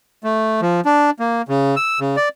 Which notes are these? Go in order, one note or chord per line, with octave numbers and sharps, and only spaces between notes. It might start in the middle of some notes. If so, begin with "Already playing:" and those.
A3
F3
D4
A#3
C#3
E6
C#3
D5